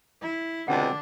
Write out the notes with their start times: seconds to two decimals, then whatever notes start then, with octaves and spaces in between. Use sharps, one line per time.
0.22 E4
0.68 C#2 B2 D3 C4 D4 F#5